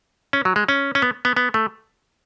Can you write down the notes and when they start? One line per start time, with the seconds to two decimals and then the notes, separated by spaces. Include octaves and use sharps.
0.33 C#4
0.45 F#3
0.56 G#3
0.69 C#4
0.95 C#4
1.02 B3
1.25 B3
1.36 B3
1.54 A3